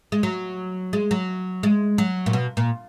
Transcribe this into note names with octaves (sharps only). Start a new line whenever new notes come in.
G#3
F#3
G#3
F#3
G#3
F#3
A#2
B2
A#2